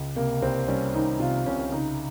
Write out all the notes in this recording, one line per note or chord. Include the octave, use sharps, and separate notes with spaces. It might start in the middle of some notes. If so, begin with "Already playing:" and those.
Already playing: C#2
C3 A#3
C2 C4
G3 C#4
D#3 D#4
C3 F4
C2 C#4
C#3 D#4